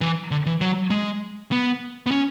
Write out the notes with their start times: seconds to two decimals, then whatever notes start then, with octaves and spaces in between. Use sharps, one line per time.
0.01 E3
0.31 D3
0.46 E3
0.61 F#3
0.90 G#3
1.52 B3
2.06 B3
2.11 C#4